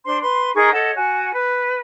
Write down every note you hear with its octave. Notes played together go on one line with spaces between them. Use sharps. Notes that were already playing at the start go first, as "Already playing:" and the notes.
D4 C5 C6
B4 C6
D#4 G#4 A#4 C#6
A4 C#5 D#5 F#5
F#4 G#5
B4